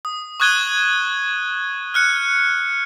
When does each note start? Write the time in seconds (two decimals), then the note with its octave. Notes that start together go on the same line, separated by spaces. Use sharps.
0.05 D#6
0.40 C#6 D#6 F#6 G#6 D#7 G7
1.94 F6 F#6 C#7